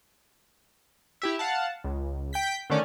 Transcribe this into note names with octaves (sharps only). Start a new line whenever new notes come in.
E4 G4 E5
F5 F#5 A5
C#2
G5 G6 B6
D3 D#3 A3 C#4 D5